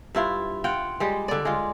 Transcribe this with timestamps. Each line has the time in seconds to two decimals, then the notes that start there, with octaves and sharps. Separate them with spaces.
0.15 G2 E4 F4
0.64 F4 F#5 G5
1.00 G3 G#3 G4
1.28 D3 D5
1.45 G#3 F4